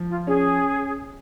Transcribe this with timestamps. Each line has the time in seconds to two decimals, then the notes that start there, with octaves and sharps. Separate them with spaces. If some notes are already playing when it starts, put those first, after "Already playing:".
Already playing: F3
0.10 F4
0.27 C#4 G#4